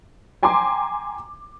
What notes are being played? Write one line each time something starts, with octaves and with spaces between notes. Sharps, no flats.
G5 G#5 A#5 C6 D6